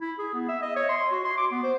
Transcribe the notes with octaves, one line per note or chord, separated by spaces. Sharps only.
E4
G#4
B3
E5
D#5
C#5
C6
F#4
C6
D6
B3
C5